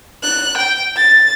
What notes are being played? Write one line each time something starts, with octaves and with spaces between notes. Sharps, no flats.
F#6
G5
A6